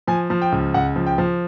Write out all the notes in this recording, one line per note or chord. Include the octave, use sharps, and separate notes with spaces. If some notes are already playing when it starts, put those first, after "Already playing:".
F3 G#5
F3
G5
C#2
C#2 F#5
F3
G5
F3